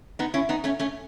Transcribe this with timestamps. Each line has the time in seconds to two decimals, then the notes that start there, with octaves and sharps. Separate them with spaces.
0.19 B3 D#4
0.34 C#4 E4
0.49 B3 D#4
0.64 A3 C#4
0.79 A3 C#4